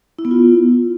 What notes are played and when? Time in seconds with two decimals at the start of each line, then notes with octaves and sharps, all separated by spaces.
0.19 E4
0.25 B3
0.31 F4